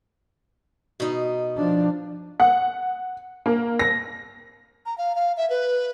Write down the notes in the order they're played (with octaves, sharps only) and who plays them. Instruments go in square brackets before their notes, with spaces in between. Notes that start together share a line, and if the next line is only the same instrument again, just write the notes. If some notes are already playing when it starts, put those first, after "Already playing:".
[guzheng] B2 D#4
[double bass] F3 D4
[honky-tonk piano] F#5
A#3
A#6
[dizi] A#5
F5
F5
E5
B4